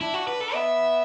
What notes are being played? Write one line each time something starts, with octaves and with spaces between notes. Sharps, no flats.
D4 E4
F#4
B4
A4
B3 E5